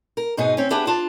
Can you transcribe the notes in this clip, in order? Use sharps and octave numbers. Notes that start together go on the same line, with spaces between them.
A#4
G#2 B2 B3 D#4 G#4
C4 C#4
B3 D4 E4 G4 G#4
D4 F4 A5